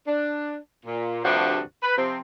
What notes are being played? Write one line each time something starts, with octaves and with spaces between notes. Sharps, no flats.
D4
A#2
D2 G2 C3 F3 D4 F#4
B4
C3 F3 C4